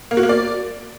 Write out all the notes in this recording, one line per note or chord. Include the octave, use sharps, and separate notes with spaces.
A#3
F#4
A#3
D5